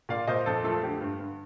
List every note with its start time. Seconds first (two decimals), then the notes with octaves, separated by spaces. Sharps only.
0.09 A#2 D5 F5
0.28 A#2 C5 D#5
0.46 F2 A4 C5
0.64 A3 F4 A4
0.83 D3 G4
1.01 G2
1.20 G2